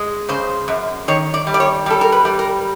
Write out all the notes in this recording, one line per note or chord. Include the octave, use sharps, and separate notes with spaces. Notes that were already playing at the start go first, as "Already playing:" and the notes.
Already playing: G#3
C#3 C5
F#2
D#3 C#5
D5
G3
D5
C#5
G3 A4
A#4
B4
G3
A#4